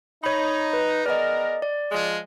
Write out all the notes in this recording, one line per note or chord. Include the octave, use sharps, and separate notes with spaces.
D#4 C#5 B5
B4
B3 G#4 A#4 D5 D#5
D5
F3 G#3